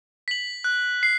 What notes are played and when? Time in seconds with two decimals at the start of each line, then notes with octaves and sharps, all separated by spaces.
0.28 B6 F#7
0.64 F#6
1.03 C7